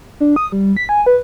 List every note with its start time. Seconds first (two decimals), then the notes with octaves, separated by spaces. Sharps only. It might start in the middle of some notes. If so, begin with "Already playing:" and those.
0.20 D4
0.36 D#6
0.52 G3
0.77 B6
0.89 G#5
1.06 B4